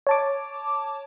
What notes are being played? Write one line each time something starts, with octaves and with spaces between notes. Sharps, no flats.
C#5 A5 D6